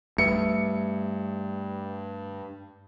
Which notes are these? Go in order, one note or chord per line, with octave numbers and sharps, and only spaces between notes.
G2 A3 B4 E5 C#7